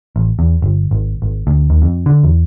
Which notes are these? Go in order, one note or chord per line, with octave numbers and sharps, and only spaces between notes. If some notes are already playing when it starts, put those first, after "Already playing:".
A1
E2
G1
G#1
G#1
D2
D#2
F2
D3
E2